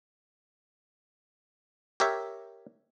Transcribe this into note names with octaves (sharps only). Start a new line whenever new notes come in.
G4 A#4 C#5 E5